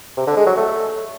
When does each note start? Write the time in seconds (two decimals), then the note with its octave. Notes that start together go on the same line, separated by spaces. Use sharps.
0.17 C3
0.27 D3
0.37 G#3
0.47 F#3
0.57 A3